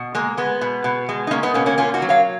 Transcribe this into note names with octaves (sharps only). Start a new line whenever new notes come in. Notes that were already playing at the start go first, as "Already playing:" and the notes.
Already playing: B2
G#3 A#3
G#3 B3
B2
B2
G#3
D#4
G#3 A#3 C#4
B3 D#4
B2 A#3 C#4
A#3 C#4
A#3 C#4 F4
D#4 F#4
F#3
C#5 F5